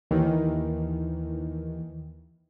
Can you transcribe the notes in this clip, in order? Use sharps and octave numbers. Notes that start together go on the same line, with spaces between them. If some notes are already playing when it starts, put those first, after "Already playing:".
D#2 D#3 E3